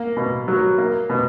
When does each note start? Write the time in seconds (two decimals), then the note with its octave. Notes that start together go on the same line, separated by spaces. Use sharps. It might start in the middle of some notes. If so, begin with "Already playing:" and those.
Already playing: A#3
0.17 B2
0.48 F#3
0.78 A#3
1.10 B2